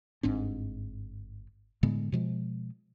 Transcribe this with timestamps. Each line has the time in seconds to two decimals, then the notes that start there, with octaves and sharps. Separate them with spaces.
0.23 G1 G#2 C4 D4
1.83 A2 D3 G#3 B3
2.12 B2 F3 G#3